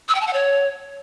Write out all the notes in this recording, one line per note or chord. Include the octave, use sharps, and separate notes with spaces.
E6
G5
A5
F#5
C#5